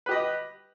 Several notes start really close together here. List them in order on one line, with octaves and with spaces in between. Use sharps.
B4 G4 D#5